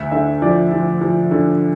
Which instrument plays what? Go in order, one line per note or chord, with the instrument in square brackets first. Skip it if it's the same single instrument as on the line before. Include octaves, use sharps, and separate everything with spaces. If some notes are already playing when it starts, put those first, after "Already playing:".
Already playing: [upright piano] D2 E5
D3 E5
F3 D5
F3
F3
D3